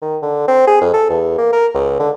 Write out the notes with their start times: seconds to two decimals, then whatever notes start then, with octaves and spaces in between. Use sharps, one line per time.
0.02 D#3
0.22 D3
0.48 C4
0.67 G#4
0.81 F2
0.94 A4
1.10 E2
1.38 A#3
1.52 A#4
1.75 C#2
2.00 D3